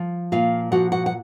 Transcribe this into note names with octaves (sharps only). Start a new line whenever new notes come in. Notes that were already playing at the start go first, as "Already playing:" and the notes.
Already playing: F3
A#2 F4 F5
F3 F#4 F#5
F#4 F#5
F#5